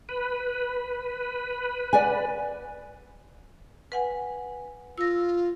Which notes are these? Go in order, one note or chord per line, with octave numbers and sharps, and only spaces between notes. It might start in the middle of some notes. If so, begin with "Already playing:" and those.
B4
D5 F#5 G#5
B4 F#5 G#5
F4 E6 A#6